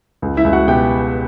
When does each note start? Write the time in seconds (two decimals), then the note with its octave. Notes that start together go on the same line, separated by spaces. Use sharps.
0.22 C#2
0.37 E4 E5
0.44 C#2
0.53 F#4 F#5
0.68 B2 G4 G5